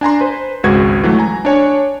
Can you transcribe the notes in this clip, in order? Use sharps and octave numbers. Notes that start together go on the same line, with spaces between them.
D4 G#5 A#5 C6
B4 C5
G#1 C#2 G#3 F#4 B4 G#6
E3 F#3 A3
G#5 A#5
D4 C#5 G#5